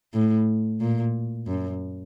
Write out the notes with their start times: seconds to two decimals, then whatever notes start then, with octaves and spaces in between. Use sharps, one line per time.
0.14 A2
0.81 A#2
1.47 F#2